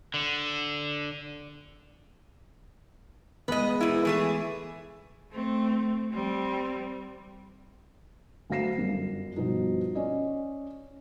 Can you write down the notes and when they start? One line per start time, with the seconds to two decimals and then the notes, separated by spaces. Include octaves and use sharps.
0.14 D3
3.48 G#3 B3 B4 D#5
3.80 A#2 E4
4.05 E3 A3 G#4
5.32 A3 C4
6.12 G3 C4
8.50 D2 F#3 F5 A#6 C7 E7
8.78 G1 F#2 G3
9.36 G2 B2 F3 D#4
9.95 C#4 D5 D#5